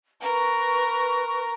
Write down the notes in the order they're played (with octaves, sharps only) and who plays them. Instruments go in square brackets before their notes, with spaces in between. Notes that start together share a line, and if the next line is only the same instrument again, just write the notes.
[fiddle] A#4 [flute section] B4 C#6